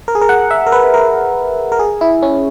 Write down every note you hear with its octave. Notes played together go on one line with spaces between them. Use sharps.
A#4
G#4
A#4
F#5
E5
A#4
B4
A#4
A#4
G#4
E4
C#4